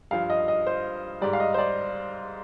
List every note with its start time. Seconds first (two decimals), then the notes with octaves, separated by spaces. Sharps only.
0.11 G2 F3 F5
0.30 D#5
0.48 D#5
0.67 C5
1.21 G#2 G3 D5
1.33 F5
1.40 D#5
1.54 C5
1.58 D5